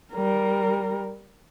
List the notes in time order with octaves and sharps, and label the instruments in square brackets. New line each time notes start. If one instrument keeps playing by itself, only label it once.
[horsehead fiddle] G3 A#4